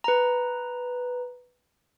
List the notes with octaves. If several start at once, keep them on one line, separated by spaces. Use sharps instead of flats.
B4 A#5